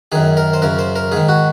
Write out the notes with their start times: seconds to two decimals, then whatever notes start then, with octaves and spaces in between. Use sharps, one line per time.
0.12 F#2 D#3 G#4
0.37 A#4
0.53 C5
0.62 F#2 C#3 A#4
0.79 C5
0.96 A#4
1.12 G#2 D#3 G#4
1.29 F#4